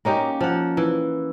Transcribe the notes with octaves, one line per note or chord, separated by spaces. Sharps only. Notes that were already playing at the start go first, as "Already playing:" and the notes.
A#3 C#4 D#4 G4
F3 F#5
E3